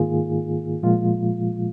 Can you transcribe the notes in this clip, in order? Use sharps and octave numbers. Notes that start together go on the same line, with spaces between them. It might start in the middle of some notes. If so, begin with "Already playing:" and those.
Already playing: G#2 D#3 A#3 F4 G#4
A#2 F3 G#3 F4